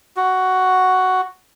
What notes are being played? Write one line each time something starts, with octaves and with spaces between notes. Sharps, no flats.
F#4